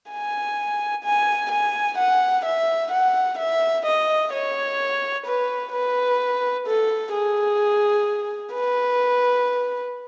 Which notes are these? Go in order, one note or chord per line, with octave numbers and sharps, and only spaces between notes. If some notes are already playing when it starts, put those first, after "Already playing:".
G#5
G#5
G#5
F#5
E5
F#5
E5
D#5
C#5
B4
B4
A4
G#4
B4